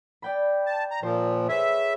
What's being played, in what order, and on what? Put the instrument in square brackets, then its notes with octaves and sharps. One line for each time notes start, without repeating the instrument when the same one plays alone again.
[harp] D5 G5 B5
[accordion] A5
A#5
[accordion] A#2 F3 [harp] C5
[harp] G#4 B4 C#5 [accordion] E5